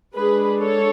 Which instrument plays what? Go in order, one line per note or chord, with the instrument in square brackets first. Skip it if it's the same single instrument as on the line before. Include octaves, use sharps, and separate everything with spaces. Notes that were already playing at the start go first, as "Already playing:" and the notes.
[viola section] G#3 D4 G#4 B4
A4 C#5